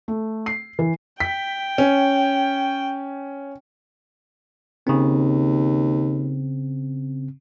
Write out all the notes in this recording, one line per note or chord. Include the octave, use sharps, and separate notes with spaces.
A3
C7
E3
G5 B6
C#4
D#2 C#3 C4